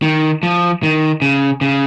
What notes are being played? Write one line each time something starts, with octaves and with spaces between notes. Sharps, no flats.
D#3
F3
D#3
C#3
C#3